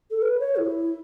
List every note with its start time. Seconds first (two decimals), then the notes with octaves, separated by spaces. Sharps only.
0.11 A4
0.22 B4
0.40 C#5
0.58 E4